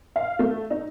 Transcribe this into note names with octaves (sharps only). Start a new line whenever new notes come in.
F5
A3
D#4